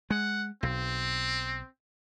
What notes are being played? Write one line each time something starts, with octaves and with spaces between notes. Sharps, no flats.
G#3 F#5
B1 C4